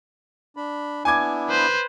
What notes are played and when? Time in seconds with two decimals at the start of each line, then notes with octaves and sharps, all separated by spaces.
0.57 D4 B5
1.05 B3 D4 E4 G#5 D6 G#6
1.49 B4 C5